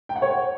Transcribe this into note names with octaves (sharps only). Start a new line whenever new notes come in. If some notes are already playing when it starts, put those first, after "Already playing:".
G5
F#5
C#5